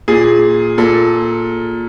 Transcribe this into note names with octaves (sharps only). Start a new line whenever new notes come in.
A#2 G#4
A#2 A4